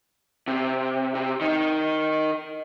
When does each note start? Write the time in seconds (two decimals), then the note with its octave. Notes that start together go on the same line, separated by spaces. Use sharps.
0.48 C3
1.15 C3
1.41 D#3 D#4